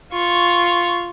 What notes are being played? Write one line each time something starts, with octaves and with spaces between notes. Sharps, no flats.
F4 C#6